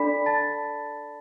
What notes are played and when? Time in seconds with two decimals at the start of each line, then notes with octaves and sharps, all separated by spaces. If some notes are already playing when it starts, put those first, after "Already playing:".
Already playing: D4 A4 D5 B5 B6
0.26 A5 A6